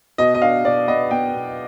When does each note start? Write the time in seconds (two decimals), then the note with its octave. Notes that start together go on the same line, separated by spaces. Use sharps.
0.18 B2 D#5
0.34 D#5
0.42 D4 F5
0.65 B2 D5
0.88 B3 D#5
1.11 B3 G5
1.34 B2